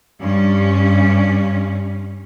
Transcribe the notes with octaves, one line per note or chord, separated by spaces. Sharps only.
G2 C#4